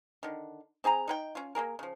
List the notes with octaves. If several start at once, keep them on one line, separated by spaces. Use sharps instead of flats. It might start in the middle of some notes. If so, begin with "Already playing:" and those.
D3 D#3
C4 G#4 G#5 A#5
D#4 B4 G5
C#4 F4
A#3 D4 G#4 A#4
C#3 F3